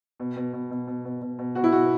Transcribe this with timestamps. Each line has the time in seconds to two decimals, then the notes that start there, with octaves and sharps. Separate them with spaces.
0.20 B2
0.36 B2
0.53 B2
0.71 B2
0.87 B2
1.05 B2
1.21 B2
1.39 B2
1.55 B2 F#4
1.64 E4
1.72 B2 F#4